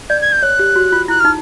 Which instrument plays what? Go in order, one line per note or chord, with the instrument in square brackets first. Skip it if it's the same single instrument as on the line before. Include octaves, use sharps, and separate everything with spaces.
[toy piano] D5 [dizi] G6
[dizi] G#6
G6
[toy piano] C#5 [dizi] F#6
[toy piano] G4
F#4
F4
[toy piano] E4 [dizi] F#6
[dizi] F6
[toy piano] D#4